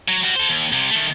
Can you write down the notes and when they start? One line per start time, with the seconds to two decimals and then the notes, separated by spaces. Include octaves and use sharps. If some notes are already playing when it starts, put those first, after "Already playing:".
0.08 F#3
0.24 G3 F#4
0.36 A4 C5
0.50 D#2
0.72 C2 C3
0.91 D#3 A3